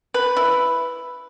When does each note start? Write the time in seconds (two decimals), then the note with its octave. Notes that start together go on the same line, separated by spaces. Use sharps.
0.14 B4
0.37 E4